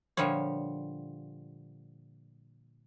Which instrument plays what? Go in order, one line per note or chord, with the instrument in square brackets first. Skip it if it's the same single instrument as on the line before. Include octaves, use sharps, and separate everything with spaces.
[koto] A#2 D3 F3 G3 C#5